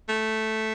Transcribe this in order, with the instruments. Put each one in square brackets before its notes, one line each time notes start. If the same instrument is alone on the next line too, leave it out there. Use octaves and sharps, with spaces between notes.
[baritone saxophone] A3